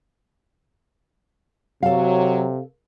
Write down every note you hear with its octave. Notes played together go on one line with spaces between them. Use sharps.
C3 F#3 A4 F5